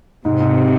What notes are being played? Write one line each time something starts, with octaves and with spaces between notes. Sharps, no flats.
G#2 C3
G#2